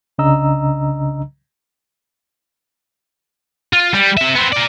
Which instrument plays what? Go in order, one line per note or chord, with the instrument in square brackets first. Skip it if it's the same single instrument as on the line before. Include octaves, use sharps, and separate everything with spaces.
[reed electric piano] C2 C#3 D4 D#5 A#5 E6
[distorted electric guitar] F4
G3
C4 E5
B3 C4
A#4 D5